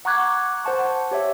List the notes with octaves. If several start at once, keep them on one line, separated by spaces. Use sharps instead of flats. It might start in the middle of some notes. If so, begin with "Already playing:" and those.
F#5 A#5 C#6 D6 F#6 G#6
C5 F#5 A5 C#6
G4 C#5 E5